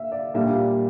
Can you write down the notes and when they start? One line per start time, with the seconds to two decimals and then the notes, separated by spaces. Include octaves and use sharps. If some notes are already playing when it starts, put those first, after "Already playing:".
Already playing: E5 F5
0.12 D5
0.34 A#2 G3 A#3 D4 E5